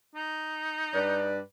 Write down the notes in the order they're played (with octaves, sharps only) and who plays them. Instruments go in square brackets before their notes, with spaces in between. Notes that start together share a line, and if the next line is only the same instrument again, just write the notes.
[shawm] D#4
[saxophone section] G2 B4 D5